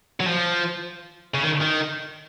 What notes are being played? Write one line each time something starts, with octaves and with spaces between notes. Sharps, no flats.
F#3
F3
C#3
D#3
D#3